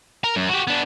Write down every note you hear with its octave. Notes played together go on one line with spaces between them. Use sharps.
A#4 A#5
F#2
F#4 G4
B3 D4